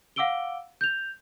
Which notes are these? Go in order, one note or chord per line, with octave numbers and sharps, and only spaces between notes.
F5 F#5 D6 E6 D7 G7
G6 F7